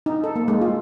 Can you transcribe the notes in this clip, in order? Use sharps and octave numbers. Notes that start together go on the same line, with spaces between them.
D#4
A4
A#3
G#3
F4